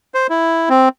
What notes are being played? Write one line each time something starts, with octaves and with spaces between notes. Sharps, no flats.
C5
E4
C4